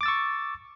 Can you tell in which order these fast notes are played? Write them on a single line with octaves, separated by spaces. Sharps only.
D6 A6 E6 C#6